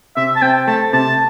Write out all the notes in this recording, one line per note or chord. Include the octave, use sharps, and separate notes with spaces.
C3 E5
A5
C4 G5
A3 A5
C3 A5